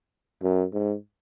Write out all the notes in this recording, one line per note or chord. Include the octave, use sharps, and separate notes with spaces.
F#2
G#2